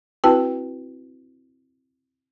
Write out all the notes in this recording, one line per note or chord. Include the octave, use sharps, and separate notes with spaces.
C4 E4 F#4 B4 G5 A5